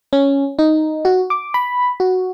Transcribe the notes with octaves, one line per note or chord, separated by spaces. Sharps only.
C#4
D#4
F#4
D6
B5
F#4